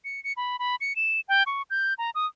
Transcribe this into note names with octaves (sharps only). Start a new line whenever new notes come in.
C#7
C#7
B5
B5
C#7
E7
G5
C#6
G6
A#5
D#6